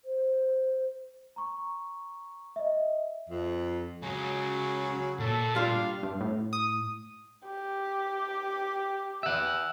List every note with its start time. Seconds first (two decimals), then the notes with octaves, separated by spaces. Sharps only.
0.05 C5
1.36 A#5 C#6
2.56 D#5 E5
3.30 F2
4.02 C#2 C#3 F#3
5.19 A#2 A4
5.55 G3 D4 F4 D5 F5
6.03 G2
6.21 A2
6.53 D#6
7.46 G4
9.23 E5 F#5